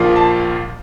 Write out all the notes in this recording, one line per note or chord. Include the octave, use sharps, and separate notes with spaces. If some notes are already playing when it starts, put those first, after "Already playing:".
Already playing: A#1 A#2 F3 A#3 F4
A5